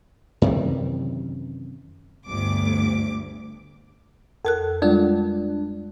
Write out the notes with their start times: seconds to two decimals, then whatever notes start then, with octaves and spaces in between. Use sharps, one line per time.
0.42 F#2 C3 D#3 E3
2.26 G1 D2 D6
4.45 F2 A4 A#4 F#6
4.82 G3 G#3 D4 F4